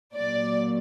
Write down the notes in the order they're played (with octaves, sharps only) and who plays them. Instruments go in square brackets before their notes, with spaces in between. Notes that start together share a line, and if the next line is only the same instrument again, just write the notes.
[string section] A#2 F#3 D5